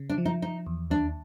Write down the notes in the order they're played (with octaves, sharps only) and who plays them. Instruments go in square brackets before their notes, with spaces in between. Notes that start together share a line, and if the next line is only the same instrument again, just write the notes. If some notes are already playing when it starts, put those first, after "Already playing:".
Already playing: [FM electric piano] C#3
[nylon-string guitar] D4
[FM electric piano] F3
[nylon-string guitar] D#4
[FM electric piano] F3 [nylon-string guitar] D#4
[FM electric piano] E2
[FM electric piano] D#2 [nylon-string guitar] D4